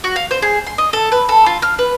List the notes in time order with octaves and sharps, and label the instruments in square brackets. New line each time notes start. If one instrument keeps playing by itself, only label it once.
[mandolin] F#4
F5
C5
G#4
C6
D#5
A4
B4
A4
F4
F6
B4